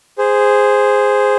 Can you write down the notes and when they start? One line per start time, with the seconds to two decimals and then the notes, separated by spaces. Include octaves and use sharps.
0.18 G#4 C5